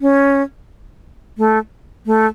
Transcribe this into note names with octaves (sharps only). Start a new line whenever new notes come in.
C#4
A3
A3